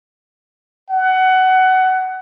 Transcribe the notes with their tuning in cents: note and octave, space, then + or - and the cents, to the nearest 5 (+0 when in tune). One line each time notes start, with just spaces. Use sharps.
F#5 +20